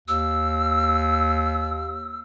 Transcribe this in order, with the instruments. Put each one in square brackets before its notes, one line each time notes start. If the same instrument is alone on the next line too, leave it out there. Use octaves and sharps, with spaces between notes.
[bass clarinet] D#2 [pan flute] E6